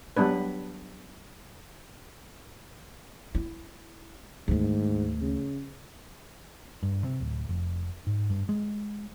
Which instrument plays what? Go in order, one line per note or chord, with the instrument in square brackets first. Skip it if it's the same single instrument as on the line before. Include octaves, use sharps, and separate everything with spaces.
[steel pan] F#3 G3 B3 D4 B4
[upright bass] E4
[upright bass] D2 D#3 [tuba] G#2
[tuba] C#3
[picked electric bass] G2
C3
D1
F1
G#2
G2
G#3